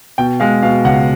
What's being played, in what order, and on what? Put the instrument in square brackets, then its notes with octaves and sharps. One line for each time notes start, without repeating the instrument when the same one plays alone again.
[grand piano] B2 G5
G#3 F5
B2 F5
C#2 F#5